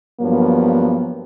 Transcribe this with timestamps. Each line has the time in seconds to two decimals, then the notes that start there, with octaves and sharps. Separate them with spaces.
0.21 G2 F3 F#3 A#3 B3